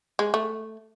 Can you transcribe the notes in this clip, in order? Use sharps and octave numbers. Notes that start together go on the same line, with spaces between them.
G#3
A3